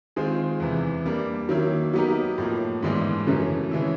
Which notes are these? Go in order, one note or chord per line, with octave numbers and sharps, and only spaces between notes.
D#3 G#3 C4 F4 G#4
E2 C3 E3
G3 A#3 D4
D#3 F#3 A#3 C#4 E4
F#3 B3 D#4 G4 A#4
A2 F3 A#3
G#2 E3 G#3 B3 D4
F#2 C#3 E3 A3 C#4
C#3 E3 G#3 C#4 E4